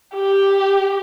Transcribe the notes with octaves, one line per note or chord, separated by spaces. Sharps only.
G4